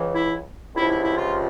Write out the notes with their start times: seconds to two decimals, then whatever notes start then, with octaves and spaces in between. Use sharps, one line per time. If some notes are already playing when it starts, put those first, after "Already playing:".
Already playing: C#2 C#3 E3
0.15 E4
0.76 C#2 C3 F3 E4
0.90 E4
1.03 E4
1.17 F4